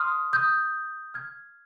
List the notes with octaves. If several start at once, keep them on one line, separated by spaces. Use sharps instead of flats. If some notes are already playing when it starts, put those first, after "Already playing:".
Already playing: C6 D#6 F6
D#6 G6
F6 G#6